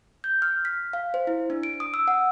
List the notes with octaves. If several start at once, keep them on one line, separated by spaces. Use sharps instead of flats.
G6
F6
B6
F5
C5
E4
D4
D7
D#6
E6
F#5